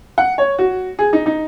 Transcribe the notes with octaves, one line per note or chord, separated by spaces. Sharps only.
F#5
C#5
F#4
G#4
D#4
D#4